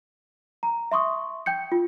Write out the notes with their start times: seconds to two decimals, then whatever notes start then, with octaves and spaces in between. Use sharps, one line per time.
0.63 A#5
0.92 E5 C6 C#6 D#6
1.46 G5 G6 C#7
1.72 F4